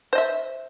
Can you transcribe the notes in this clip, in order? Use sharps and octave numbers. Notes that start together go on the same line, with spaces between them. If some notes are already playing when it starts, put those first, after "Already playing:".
C5 D#5 E5